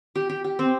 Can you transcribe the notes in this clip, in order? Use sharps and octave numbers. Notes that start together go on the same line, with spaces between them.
G4
G4
G4
C4